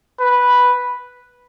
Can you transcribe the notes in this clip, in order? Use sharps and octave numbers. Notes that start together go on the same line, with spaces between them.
B4